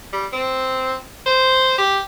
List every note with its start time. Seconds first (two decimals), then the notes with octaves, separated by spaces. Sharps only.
0.13 G3
0.33 C4
1.26 C5
1.78 G4